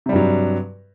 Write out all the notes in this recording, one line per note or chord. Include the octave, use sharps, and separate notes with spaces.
G2 C3 F#3 G3